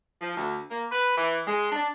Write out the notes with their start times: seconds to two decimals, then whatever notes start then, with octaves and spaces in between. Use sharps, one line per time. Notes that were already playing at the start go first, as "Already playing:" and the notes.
0.21 F3
0.37 D2
0.70 A#3
0.91 B4
1.16 E3
1.47 G#3
1.72 D4